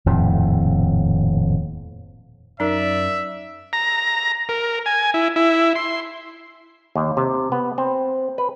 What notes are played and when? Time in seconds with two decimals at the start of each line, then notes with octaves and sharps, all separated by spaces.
0.06 D#1 F2 A2 C3
2.60 F#2 D#4 A#4 D5 E5
3.73 A#5
4.49 A#4
4.86 G#5
5.14 E4
5.36 E4
5.75 C6
6.95 D#2
7.17 C3
7.52 B3
7.78 C4
8.38 B4